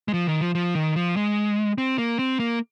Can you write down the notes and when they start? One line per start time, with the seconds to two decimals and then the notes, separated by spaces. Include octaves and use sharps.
0.08 G#3
0.14 F3
0.27 D#3
0.41 F3
0.55 F3
0.75 D#3
0.96 F3
1.16 G#3
1.78 C4
1.98 A#3
2.19 C4
2.40 A#3